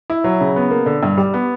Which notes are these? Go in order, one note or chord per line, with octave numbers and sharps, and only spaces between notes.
E4
F#3
C#3
B3
A#3
D3
G2
G3
B3